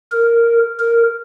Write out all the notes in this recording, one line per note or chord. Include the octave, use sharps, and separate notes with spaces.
A#4
A#4